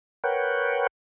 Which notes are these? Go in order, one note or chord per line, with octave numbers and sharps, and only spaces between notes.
A#4 B4 C#5 F#5 G5